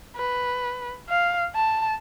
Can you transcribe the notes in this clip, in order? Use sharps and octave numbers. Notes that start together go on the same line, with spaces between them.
B4
F5
A5